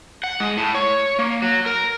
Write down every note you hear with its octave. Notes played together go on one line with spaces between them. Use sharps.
F#5
G#3
A2
C#5
A#3
F#3
A#4